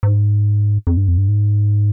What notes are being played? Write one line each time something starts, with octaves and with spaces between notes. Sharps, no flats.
G#2
F2
G2
F2
G2
G#2